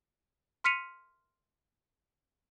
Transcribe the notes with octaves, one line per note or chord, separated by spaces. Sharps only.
C6 F6 B6 C#7 D#7 F7